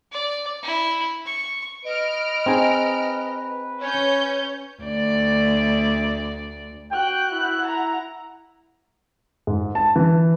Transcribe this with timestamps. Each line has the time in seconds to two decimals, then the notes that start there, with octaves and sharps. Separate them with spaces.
0.12 D5
0.63 E4
1.26 C#6
1.85 B4 D#5 F6 D7
2.46 C4 D#4 G#4
3.80 C#4 C#5 G6
4.82 D2 D5
6.92 F#4 G5 F#6
7.31 E4
7.61 F#5 A#5
9.47 G#2
9.75 A5
9.96 E3